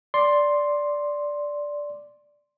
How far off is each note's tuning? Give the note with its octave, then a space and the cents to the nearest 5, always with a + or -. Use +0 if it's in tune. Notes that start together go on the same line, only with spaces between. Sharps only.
D5 -5 C6 +5